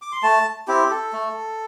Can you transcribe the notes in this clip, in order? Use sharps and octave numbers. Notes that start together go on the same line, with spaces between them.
D6
C6
A3 A5
C4 E4 G4
A4
A3